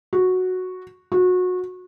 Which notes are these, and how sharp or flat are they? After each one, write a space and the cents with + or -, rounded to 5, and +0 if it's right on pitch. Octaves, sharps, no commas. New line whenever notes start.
F#4 -5
F#4 -25